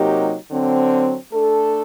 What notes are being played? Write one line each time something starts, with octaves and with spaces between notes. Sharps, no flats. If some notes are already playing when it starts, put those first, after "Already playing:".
Already playing: C3 F#3 A#3 D#4 G4
D3 F#3 C4
A3 D4 A4